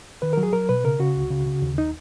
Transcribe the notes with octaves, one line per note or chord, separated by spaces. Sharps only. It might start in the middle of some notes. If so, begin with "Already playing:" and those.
D#3 B4
A#4
F#3
G#4
F#3 A#4
B2 B4
C#3 A#4
C#3 F#4
C#2
C#3
C#3
D#2
D#4